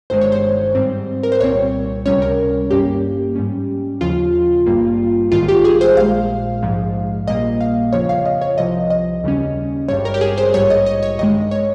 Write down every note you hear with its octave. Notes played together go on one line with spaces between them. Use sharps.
G1 G2 D#3 G#3 C5
C#5
C5
G#2 G3 C4
A#4
C5
C2 A#2 G3 C4 C#5
C#2 C3 G3 C#4 C#5
A#4
G1 G2 G3 A#3 C#4 G4
G#2 G3 C#4
D#2 C#3 F3 F4
G#1 G2 G3 A#3
A#1 G#2 D#3 G3 F4
G4
G#4
C5
A#1 A#2 G#3 F5
A#1 G#2 F3 G#3
A#1 A#2 G3 A#3 D#5
F5
G1 F2 C#3 F3 C#5
F5
D#5
C#5
C2 C3 F3 D#5
D#5
D#2 C#3 G3 C#4
G#1 G2 G3 C#5
A#4
G4
G#4
C5
A#1 G#2 G3 C#5
D#5
D#5
C#5
G2 D#3 G#3 D#5
C#5